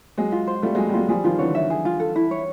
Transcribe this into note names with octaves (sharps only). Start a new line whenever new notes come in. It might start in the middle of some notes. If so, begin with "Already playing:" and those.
F#3 G#3 G#4
F4
C5
G3 A3 F4
F#3 G#3
G#4
G3
F#3 G#3 F4
F3 G3 G#4
D#3 F3 F4
D3 E3 C#5
E5
G#4
F4
A4
E4
C#5